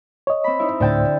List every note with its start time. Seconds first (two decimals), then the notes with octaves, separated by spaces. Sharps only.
0.27 C#5 D#5
0.44 C4 B5
0.59 D#4 E4
0.80 D2 A2 D3 C5 G5 A5